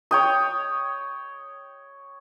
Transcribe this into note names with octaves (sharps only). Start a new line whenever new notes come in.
C#5 G5 D#6